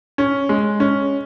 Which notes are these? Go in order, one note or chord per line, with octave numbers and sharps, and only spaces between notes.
C#4
G#3
C#4